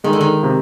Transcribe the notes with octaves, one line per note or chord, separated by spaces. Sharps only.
D#3 G#3
D3
D#3
C3